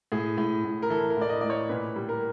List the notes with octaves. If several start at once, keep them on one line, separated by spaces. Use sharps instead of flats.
A2 G#4
A2
A2
A#4
E3 A4
A#4
A2 D5
D#5
A2 D5
C#5
A#2 B4
G3
A#4